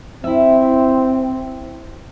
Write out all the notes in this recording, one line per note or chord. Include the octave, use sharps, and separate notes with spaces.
C4 E4 E5